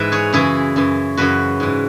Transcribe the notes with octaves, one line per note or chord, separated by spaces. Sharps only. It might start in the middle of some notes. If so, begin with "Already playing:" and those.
Already playing: G#2 E3 B4 E5
G#4 C#5
F#2 C#3 E3 E4 G#4
F#2 E3
F#2 C#3 E3 F#4 B4
G#2 E3